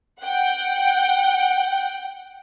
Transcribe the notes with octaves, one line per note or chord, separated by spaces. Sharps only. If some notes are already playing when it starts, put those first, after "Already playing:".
F#5 G5